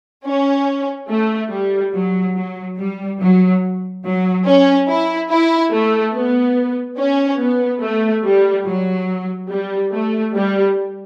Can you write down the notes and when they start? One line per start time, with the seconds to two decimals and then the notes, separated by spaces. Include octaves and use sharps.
0.25 C#4
1.09 A3
1.51 G3
1.93 F#3
2.35 F#3
2.78 G3
3.19 F#3
4.04 F#3
4.45 C#4
4.88 E4
5.30 E4
5.72 A3
6.14 B3
6.98 C#4
7.40 B3
7.83 A3
8.24 G3
8.66 F#3
9.51 G3
9.93 A3
10.35 G3